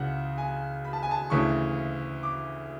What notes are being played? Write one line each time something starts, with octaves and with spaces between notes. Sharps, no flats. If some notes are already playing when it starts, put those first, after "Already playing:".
Already playing: C#2 C#3 E3 F#5
G#5
B5
A5
G#5
A5
D2 C#3 E3 C#6
D6